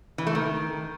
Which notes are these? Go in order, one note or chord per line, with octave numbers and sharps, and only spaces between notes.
E3
A3
D#3